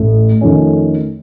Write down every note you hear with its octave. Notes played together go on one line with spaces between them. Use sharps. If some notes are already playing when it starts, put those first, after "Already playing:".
Already playing: A1 A2 A3
F2 D#3 A3 C#4